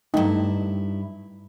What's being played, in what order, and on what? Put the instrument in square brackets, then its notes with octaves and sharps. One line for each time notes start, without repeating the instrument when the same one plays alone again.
[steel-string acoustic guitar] G2 E4 [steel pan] A3 D#4